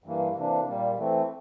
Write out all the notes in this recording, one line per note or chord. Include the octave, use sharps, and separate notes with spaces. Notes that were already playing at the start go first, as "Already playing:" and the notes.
G2 E3 A#3
C3 E3 A#3 D4
A#2 G3 A#3
E3 A3 C4